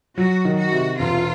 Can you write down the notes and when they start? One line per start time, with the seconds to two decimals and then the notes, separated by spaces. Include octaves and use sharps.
0.17 F#3 F#4
0.45 D#3
0.58 F#4
0.72 C3
0.98 E1 F4